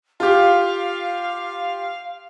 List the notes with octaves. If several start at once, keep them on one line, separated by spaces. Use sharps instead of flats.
F4 G4 F5